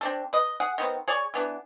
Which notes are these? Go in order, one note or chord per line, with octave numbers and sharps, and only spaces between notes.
C4 D4 A4
B4 D#5
G#4 F#5
D#3 B3 C4
G#4 C#5 D5 G#5
E3 B3 D4